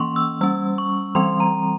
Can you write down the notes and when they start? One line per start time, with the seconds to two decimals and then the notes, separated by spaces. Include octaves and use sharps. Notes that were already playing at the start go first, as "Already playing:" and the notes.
Already playing: E3 A#3 C#4 C6 C#6
0.16 E6
0.41 G3 C#4 E6
0.78 C#6
1.15 E3 G3 C4 C6
1.40 A#5